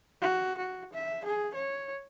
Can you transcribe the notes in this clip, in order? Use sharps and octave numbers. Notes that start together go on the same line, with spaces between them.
F#4
F#4
E5
G#4
C#5